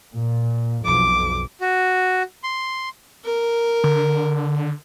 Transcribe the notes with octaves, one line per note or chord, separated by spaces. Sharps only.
A#2
B1 F2 D6
F#4
C6
A#4
D3